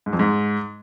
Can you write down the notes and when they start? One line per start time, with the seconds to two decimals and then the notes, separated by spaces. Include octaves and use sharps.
0.06 G#2
0.13 F2
0.19 G#2